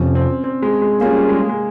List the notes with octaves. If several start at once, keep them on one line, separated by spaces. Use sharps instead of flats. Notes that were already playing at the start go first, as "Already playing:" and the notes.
Already playing: F2 C3 F3 C#4
C4
C4
G#3
G#3
G3 A#3 C#4 F4 G#4
G#3
G#3